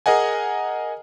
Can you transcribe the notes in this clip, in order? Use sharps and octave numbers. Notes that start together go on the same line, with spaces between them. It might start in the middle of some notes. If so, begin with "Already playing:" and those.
G#4 A#4 D#5 F#5 G#5